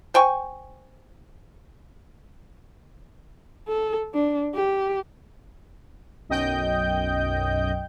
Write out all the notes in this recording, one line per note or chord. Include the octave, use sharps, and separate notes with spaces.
C5 G5 G#5 C#6
A4
D4
G4
B1 F#2 D#5 G5 G6